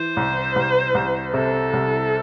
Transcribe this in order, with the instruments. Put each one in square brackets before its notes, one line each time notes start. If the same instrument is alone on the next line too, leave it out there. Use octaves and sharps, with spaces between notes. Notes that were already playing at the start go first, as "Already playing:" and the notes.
Already playing: [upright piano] E3 [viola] C5
[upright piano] C2
C2
C2
[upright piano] C3 [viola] A4
[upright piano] C2